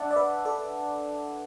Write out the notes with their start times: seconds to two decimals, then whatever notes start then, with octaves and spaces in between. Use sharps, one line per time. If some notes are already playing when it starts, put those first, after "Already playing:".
Already playing: D4 D5 E5 F#5 A5 D6
0.11 D5
0.16 B4 E5
0.45 A4 D5